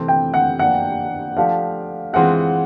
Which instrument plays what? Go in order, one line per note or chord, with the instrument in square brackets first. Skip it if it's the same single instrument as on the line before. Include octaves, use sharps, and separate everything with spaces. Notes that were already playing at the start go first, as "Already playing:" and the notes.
Already playing: [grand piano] C3 E3 A3 C4
[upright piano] G5
F#5
[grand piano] F3 A#3 D4 [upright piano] F#5
[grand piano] F3 A3 D4 G4 [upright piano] F5
[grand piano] E3 G#3 C4 F4 G#4 [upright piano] F#5